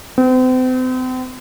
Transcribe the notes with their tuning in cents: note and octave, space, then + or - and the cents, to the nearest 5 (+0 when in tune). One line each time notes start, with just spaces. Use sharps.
C4 -40